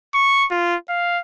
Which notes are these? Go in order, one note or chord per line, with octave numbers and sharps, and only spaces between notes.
C#6
F4
F5